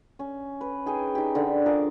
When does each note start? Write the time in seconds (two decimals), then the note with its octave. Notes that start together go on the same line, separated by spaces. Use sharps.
0.19 C#4
0.61 B4
0.86 D#4 G#4 G5 G#5
1.15 D#4 G4
1.35 D3
1.66 F3 G#4 A#4 D5